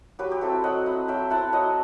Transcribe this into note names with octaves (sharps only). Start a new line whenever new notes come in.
F#3 G4 B4
G4
C4 E4 F#4 A4
F#3 D#5 F#5
C4 E4
F#3 E5 G5
C4 E4 F#5 A5
F#3 D#5 F#5